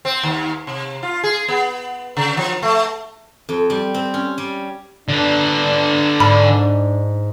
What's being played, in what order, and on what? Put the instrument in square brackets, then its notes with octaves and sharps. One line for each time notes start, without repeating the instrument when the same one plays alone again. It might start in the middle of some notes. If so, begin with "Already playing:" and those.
[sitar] C4
D#2
C3
F4
G#4
B3
C#3
F3
A3
[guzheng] F2
G3
C4
C#4
G3
[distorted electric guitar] D3 B4 [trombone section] D4
[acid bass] G#2 [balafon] B5